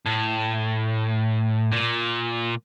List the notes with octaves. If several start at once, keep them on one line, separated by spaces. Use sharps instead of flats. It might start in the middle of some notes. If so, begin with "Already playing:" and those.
A2
A#2